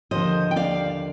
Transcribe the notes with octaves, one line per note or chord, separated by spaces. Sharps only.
D#2 D3 F3 C5 D#5
G5
D5 F5